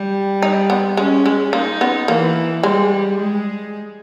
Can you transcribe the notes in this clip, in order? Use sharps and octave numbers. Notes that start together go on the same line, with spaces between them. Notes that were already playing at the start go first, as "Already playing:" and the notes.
Already playing: G3
D#4
B3
G#3 C#4
G#3
A#3 D#4
B3
E3 A#3
G3 G#3
G#3